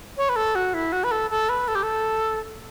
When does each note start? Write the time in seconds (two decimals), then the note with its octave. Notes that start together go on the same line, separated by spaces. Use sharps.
0.17 C#5
0.29 B4
0.36 A4
0.55 F#4
0.74 E4
0.92 F#4
1.04 B4
1.11 A4
1.31 A4
1.49 B4
1.68 A4
1.75 G4
1.83 A4